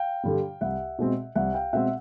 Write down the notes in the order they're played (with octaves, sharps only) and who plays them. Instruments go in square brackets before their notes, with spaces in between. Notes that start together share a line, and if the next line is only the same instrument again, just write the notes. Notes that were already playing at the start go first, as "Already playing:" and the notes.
Already playing: [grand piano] F5 G5
G2 D3 G3
C2 E5 F#5
B2 G#3 C4
C2 E5 F#5
F5 G5
B2 G#3 C4 E5 F#5